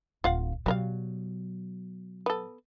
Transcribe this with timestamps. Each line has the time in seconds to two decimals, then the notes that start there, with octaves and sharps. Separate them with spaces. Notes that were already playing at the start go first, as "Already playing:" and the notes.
0.24 D1 F4 F5 F#5
0.66 B2 F#3 G3 A#4 F5
2.26 B3 A4